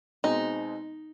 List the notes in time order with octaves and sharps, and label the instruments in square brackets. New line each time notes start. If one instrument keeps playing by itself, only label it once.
[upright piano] B2 G#3 C4 [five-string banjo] D#4